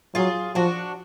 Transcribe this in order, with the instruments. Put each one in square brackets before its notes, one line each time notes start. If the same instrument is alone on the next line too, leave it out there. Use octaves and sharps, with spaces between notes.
[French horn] F#3 [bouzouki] F4 G#4
[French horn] F3 [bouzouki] D4 F#4